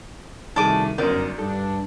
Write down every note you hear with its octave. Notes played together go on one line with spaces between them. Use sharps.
C2 B2 D#3 A3 D4 G#4 D6 D#7
G1 F#2 D#4 A#4 D5
G2 D4 A4